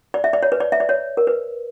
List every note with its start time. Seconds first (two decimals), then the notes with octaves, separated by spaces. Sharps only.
0.14 D5
0.24 E5
0.33 D5
0.43 C#5
0.52 B4
0.60 D5
0.72 E5
0.80 D5
0.89 C#5
1.17 A#4
1.27 B4